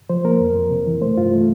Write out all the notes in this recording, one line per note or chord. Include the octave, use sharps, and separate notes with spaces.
F3 C5
A#3 A#4
F2
F2
C3
E3
A3 C5
G2 F4
A3